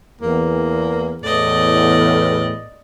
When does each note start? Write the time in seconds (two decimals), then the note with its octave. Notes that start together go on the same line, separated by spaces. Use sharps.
0.21 E2 A#3
1.23 E2 A2 D5 D#5